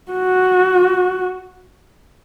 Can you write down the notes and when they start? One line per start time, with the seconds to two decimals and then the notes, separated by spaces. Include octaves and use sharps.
0.12 F#4